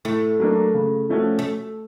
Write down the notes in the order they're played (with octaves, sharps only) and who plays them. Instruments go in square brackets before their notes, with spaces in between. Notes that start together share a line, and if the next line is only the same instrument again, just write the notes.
[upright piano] A2 [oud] A3
[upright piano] F#3 A#3 D4
C#3
F3 A3 C#4 F#4
[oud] A3